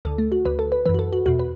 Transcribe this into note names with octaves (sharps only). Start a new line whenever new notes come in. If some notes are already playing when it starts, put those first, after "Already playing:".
D2 D3 A4
A3
F#4
D2 D3 B4
A4
B4
F#2 E3 B4
F#4
A4
F#4
E2 B2 F#4
B4